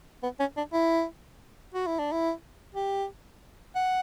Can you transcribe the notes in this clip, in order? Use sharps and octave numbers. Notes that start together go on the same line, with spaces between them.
B3
C#4
D4
E4
F#4
E4
D4
E4
G4
F#5